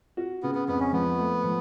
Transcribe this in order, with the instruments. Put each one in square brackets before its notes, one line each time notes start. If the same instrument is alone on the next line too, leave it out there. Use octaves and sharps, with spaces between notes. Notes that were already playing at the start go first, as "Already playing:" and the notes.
[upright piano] F#4
[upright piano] C#3 [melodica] B3
[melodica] B3
[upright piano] F2 [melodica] B3
[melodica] C#4
[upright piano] F3 [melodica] B3
[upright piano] A3
F3